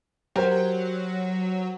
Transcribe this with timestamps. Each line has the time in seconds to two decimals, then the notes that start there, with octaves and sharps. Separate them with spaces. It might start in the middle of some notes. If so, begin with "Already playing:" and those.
0.36 F#3 G4 A#4 C5